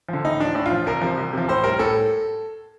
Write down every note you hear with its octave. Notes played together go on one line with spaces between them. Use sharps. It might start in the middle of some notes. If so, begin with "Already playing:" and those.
D3 F3
A2 D#4
F3 D4
A2 D4
F4
F3
C2 A#4
C3 F3
C2
C3 F3
A2 C5
G3 A#4
A2 A4